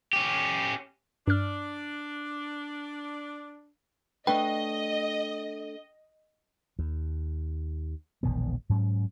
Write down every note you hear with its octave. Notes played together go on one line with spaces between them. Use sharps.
C#4 G4
G2 D4 F6
A3 D4 B4 D#5 G5
D#2
E1 A#1 D#3 B3
G#2 F#3 C#4